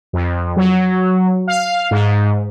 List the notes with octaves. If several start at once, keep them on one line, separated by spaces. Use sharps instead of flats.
F2
F#3
F5
G#2